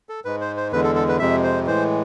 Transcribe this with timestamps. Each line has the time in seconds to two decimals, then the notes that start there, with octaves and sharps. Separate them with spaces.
0.09 A4
0.25 G#2 G#3 B4
0.41 C5
0.57 C5
0.72 E2 D3 G#3 B4
0.84 A4
0.96 A4
1.08 B4
1.19 F2 C3 G#3 E5
1.44 C5
1.66 A2 E3 G#3 C5